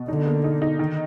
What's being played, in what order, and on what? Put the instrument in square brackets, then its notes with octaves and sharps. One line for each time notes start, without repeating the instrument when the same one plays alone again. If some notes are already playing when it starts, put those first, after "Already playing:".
Already playing: [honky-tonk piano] B2
[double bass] D3 [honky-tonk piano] D#4
[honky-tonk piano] A#3
D#4
D#4
D#3